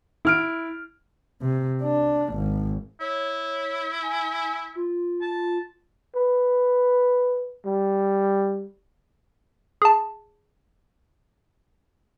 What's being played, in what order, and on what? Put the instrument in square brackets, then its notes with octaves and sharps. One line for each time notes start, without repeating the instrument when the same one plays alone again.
[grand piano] E4 F6 D7
[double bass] C3
D4
G#1
[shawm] E4 [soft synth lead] C#5
[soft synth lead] G#5
F4
[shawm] A5
[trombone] B4
G3
[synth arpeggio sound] G#4 A5